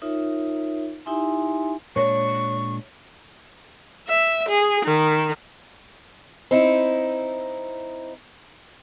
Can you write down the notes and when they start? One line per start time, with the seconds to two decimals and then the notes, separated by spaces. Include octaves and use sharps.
0.02 D#4 F4 A#4 C#5 E5
1.06 D#4 E4 G4 E5 G#5 C6
1.96 A#2 G#3 D4 C#5 C#6
4.07 E5
4.48 G#4
4.85 D#3
6.51 C4 D#4 E4